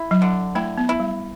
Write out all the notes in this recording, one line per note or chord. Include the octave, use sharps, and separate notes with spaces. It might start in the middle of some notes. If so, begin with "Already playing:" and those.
Already playing: E4
F#3
D3
A3 E4
B3
E4
G3